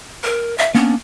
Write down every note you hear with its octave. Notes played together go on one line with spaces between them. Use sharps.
A#4
E5
A#3 B3 C#4 D4